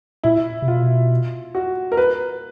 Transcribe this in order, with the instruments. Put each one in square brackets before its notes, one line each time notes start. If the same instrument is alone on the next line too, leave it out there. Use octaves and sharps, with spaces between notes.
[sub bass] A#2 [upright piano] E4
[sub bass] C3
[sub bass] B2 [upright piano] F4
[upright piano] F#4
A#4
B4